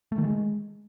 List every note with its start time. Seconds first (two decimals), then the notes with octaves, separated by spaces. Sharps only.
0.12 A3
0.18 D#3
0.24 G#3